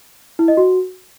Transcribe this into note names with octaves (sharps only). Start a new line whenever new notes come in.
E4
D#5
F#4